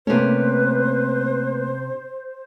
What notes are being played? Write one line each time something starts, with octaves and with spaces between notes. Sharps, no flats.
C3 A3 A#3 C#4 B4 C5